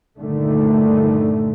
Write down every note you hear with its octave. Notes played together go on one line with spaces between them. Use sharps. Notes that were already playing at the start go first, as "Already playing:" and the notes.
G1 A#2 D3 D#3 A3